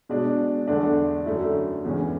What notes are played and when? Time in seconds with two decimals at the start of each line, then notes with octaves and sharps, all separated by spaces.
0.09 B2 G#3 D4
0.68 E2 D3 A3 D4
1.26 F#2 D3 A3 E4
1.85 E2 C#3 E3 G#3 C#4